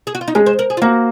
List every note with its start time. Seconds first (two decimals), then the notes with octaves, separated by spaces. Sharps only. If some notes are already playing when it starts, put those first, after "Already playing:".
0.07 G#4
0.15 F#4
0.21 F4
0.28 D#4
0.35 G#3 C#4
0.46 C5
0.59 A#4
0.70 G#4
0.77 F4
0.82 A#3 F#4